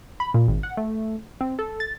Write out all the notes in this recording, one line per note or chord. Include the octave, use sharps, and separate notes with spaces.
B5
A#2
G#1
F#5
A3
C4
A4
A6